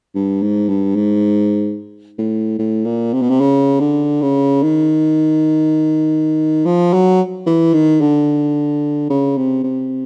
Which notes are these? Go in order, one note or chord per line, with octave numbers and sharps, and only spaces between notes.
G2
G#2
G2
G#2
A2
A2
A#2
C3
B2
C3
C#3
D3
C#3
D#3
F3
F#3
E3
D#3
D3
C#3
C3
C3